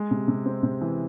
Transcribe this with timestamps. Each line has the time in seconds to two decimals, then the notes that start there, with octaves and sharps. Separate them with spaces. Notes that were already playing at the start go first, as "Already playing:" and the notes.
Already playing: G#3
0.11 C3
0.28 C3
0.46 C4
0.63 C3
0.81 E3